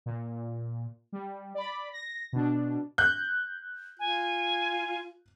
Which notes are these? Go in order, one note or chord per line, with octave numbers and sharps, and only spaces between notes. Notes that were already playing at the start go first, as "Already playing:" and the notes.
A#2
G3
D5 B5
A#6
B2 D4
F#6 G6
F4 G#5